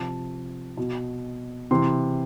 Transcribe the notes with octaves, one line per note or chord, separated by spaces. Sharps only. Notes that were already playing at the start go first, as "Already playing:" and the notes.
Already playing: C3 F3 A5
B2
C3 E3 C6